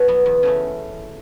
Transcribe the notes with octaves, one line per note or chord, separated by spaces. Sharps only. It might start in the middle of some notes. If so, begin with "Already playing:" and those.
Already playing: B2 B4 C#5
F#3 B3
E2
C#3 A3 C#4